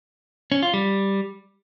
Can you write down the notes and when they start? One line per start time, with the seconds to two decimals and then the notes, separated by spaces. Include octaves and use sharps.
0.52 C#4
0.63 F4
0.74 G3